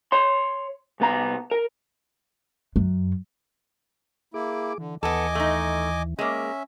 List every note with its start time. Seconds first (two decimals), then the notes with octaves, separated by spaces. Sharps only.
0.12 C#5 C6
1.00 C2 B3 A#5
1.51 A#4
2.76 F#2
4.34 A#3 E4 G#4 D6
4.78 D3 E3
5.03 D#2 E3 B3 A4 D#5 G#5 D6
5.35 A3 D#4
6.19 G#3 A#3 C#4 E5